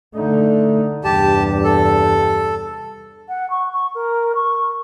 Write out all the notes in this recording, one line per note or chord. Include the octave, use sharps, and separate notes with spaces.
D3 A3 D#4
E2 G2 C3 G4 A5
A4
F#5
C#6
C#6
A#4
C#6